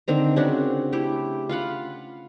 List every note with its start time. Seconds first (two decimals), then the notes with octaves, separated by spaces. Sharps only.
0.08 D3 D#3 C4 A#5
0.36 C#3 C4 D4 F#4
0.92 A3 E4 G4
1.49 F4 F5 F#5 B5